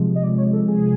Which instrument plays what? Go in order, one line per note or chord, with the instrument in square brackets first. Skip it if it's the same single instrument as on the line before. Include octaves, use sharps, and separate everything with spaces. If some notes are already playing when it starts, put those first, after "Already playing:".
Already playing: [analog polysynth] C3 F3 G#3
D#5
D5
C#5
A4
G#4